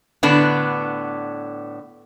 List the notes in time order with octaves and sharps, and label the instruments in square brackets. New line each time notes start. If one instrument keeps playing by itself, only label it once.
[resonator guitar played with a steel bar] A2 D3 B3 D4